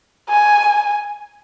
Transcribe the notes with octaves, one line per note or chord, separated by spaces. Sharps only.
G#5